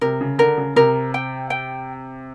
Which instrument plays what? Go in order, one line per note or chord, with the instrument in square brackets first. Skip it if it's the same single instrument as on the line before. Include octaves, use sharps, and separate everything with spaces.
[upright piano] C3 [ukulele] A#4
[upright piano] C#3
[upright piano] D3 [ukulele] A#4
[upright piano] C#3
[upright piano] C3 [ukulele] A#4
[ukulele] G5
G5